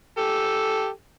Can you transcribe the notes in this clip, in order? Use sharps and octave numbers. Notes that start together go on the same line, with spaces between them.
G4 A4